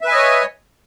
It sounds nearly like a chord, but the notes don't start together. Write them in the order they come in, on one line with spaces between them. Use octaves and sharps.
E5 B4 G#5 D#5 C#5